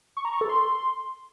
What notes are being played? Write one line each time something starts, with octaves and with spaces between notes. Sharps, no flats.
C#6
A#5
C#6
A4
C6